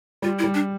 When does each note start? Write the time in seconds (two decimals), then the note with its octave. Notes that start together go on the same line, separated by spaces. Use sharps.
0.22 G3 F4
0.39 E4
0.44 G3
0.54 D4